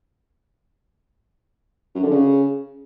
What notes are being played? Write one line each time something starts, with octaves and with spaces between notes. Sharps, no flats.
F#2
D3
C#3